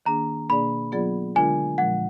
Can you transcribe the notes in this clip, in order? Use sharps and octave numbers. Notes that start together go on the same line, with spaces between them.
D#3 A#3 D4 G#4 A#5
B2 A#3 D4 G#4 D5 B5
F#3 B3 F4 G#4 D5
D3 G#3 D4 F4 A#4 G#5
A#2 F3 G#3 F#5